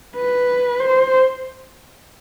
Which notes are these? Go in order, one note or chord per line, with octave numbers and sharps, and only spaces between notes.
B4
C5